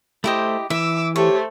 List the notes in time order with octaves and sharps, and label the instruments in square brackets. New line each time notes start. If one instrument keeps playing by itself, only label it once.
[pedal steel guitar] A3 C5 [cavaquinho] E4 G4 D#5
[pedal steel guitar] E3 [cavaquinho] E5 [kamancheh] D6 E6
[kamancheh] A3 C5 [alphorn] G4 [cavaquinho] C#5